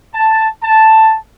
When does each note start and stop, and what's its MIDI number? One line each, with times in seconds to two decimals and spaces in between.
0.14 0.47 81
0.64 1.17 81